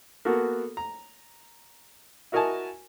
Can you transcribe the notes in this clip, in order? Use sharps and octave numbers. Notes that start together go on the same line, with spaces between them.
A#3 B3 F#4 A4 A#4
A#5
E4 F#4 A#4 D#5 G#5 A5